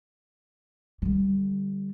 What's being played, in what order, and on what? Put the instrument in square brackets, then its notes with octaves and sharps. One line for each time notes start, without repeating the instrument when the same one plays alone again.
[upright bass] D3 G3